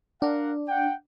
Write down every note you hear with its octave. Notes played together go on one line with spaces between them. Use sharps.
D4 A#4 F5 F#5
F#5 G5